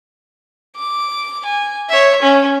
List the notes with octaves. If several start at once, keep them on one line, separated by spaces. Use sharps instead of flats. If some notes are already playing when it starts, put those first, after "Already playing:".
D6
G#5
C#5 E5
C#4